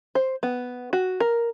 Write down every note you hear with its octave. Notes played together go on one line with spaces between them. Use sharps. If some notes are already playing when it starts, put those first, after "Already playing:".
C5
B3
F#4
A#4